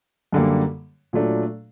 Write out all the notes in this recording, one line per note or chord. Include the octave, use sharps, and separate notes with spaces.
F#2 D3 G3 A#3
A#2 F#3 A3 D4